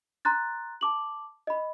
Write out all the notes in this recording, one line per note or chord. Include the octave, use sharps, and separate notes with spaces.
A#5 C6 F#6 A6
A5 D6 F#7
D#5 B5